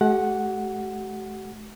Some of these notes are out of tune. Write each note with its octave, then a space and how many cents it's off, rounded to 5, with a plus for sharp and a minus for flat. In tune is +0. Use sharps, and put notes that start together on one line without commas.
A3 -45 G4 -45 F#5 +0